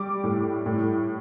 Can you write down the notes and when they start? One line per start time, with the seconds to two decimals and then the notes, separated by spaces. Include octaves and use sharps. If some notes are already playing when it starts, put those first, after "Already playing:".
Already playing: G3 D6
0.23 A2
0.66 A2